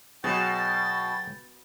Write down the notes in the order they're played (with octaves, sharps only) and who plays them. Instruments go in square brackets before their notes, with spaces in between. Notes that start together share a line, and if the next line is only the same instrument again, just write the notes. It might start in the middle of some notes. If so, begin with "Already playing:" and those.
[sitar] B2 [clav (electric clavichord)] F#3 F#4 G#4 [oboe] G5 [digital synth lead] A6